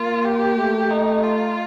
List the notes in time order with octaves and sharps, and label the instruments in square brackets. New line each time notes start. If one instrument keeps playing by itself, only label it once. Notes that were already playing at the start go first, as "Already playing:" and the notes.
Already playing: [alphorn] A#3 [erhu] F4
[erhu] G4
[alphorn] A3
[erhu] D#4
F4